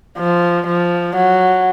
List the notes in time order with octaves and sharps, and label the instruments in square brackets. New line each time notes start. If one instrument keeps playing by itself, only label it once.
[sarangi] F3
F3
F#3